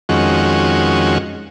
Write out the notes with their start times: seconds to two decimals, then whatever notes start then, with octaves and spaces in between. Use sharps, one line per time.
0.09 F2 D#3 G#3 C#4 F#4